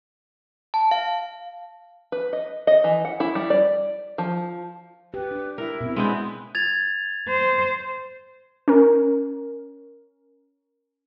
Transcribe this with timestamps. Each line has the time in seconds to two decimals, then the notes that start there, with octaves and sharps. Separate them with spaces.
0.74 A5
0.91 F5
2.12 B4
2.33 D#5
2.67 D#5
2.84 E3
3.05 F#5
3.20 E4
3.35 G3
3.50 D5
4.18 F3
5.14 G4 B4
5.31 D4
5.58 E4 A#4
5.81 B2 C4
5.96 G#3 B3 C4 D4
6.55 G#6 A6 F7
7.28 C5
8.68 C#4 A#4